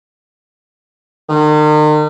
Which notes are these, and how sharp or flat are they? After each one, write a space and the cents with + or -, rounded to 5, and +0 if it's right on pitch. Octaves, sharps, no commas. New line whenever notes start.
D#3 -40